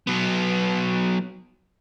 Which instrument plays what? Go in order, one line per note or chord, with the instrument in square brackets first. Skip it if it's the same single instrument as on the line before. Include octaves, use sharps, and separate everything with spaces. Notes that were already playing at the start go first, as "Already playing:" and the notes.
[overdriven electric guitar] F#3 B3